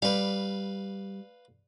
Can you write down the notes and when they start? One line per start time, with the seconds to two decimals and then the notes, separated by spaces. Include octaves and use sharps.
0.02 G3 B4 F5